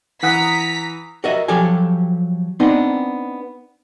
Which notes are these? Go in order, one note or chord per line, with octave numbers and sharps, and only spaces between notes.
E3 F#5 A#5 D#6 B6
F#4 A#4 D#5 E5
F3 F#3 G4 A4 G#5
B3 C4 D4 D#4 C6